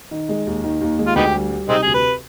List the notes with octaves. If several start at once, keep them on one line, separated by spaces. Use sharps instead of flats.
D#3
G#3
D#2
D#3
D#2
G#3
F4
D2 B3 D#4 G4
G3
G3
C3 G#3 C4 D#4
D2 G#4
B4